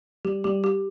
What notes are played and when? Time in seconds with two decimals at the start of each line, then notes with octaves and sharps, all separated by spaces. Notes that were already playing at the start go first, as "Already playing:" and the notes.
0.25 G3 G4
0.44 G3 G4
0.64 G4